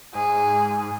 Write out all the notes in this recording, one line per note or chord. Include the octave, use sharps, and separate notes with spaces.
G#2 G#4